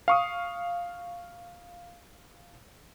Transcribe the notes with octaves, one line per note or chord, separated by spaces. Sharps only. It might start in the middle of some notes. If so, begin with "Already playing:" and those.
F5 C#6 D#6